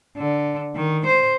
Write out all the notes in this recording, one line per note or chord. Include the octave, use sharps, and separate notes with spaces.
D3
D#3
C5